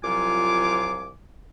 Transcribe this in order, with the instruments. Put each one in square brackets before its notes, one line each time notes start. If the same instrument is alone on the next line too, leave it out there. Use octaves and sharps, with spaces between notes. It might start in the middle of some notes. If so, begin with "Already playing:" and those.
[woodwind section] C2 F3 F#3 F4 G#5 D6